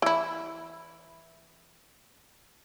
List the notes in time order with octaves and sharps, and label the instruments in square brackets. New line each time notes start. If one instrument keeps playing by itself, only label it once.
[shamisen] E3 E4